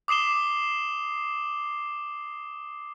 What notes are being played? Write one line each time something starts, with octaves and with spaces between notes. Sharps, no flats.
D6 D#6 C7 E7 G7